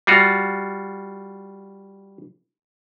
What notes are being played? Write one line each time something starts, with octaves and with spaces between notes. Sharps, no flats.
G3 F4 F#4